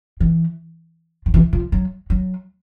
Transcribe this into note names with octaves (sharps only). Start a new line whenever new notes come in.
E3
F3
E3
F3
F#3
F#3